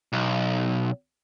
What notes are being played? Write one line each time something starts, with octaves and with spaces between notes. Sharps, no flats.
B1